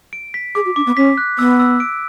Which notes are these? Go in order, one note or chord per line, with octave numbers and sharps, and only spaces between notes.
D7
B6
G#4 D6
F#4
D4 D6
B3
C#4 B6
F#6
B3 E6
E6
D7